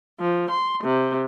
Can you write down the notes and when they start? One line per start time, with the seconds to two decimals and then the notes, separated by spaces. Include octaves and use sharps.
0.20 F3
0.51 C6
0.83 C3